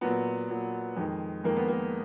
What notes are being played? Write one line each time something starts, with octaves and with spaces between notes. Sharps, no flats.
A#2 F#3 B3
A#2 F#3
F2 D#3 G#3
F2 D#3 G#3 A#3
B3
A#3